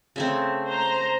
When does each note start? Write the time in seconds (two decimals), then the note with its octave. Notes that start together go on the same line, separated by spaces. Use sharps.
0.16 C#3 A3 C4
0.67 C5 A#5